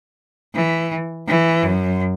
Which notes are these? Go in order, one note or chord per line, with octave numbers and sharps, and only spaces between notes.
E3
E3
F#2